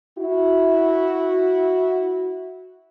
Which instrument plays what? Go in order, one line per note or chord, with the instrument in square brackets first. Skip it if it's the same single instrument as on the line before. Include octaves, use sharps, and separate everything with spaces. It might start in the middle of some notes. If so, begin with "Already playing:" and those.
[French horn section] E4 F#4